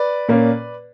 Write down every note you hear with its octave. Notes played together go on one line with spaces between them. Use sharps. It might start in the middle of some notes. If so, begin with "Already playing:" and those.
Already playing: B4 D5
A#2 A#3 C#4